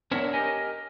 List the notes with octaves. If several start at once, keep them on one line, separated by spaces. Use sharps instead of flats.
B3 D4 A#4 C#5 E5 F#5
G4 A#4 D#5 G5 G#5